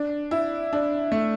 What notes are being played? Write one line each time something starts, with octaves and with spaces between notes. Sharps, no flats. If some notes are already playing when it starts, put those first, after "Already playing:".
Already playing: D4
E4
D4
A3